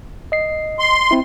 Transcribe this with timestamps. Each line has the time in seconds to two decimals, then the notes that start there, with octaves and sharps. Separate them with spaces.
0.32 D#5 C7
0.79 C6
1.11 C4 E4